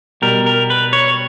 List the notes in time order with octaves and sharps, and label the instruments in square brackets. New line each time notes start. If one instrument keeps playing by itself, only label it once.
[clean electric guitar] B2 G3 A#4
A#4
B4
C#5